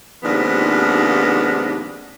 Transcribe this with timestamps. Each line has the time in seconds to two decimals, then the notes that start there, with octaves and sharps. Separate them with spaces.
0.23 D#2 G#2 C3 F3 B3 D4